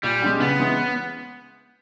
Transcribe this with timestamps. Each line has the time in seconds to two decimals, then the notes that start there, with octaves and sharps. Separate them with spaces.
0.03 A#2 G3
0.22 G#3 C#4 G4
0.40 C#3 B3
0.60 E3 G#3 C#4